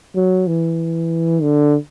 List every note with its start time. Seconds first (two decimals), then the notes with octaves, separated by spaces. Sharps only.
0.15 F#3
0.47 E3
1.42 D3